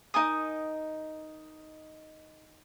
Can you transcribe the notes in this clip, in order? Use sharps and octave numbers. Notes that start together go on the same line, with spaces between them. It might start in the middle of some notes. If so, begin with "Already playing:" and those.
D#4 A#4 G#5 D#6